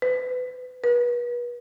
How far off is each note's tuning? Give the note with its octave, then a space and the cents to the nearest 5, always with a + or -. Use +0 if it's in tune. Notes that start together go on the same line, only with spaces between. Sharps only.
B4 +30
B4 -35